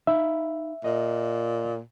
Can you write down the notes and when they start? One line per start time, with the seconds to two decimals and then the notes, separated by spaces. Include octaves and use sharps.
0.07 D#4 E5 F5 B5
0.84 A#2 D#5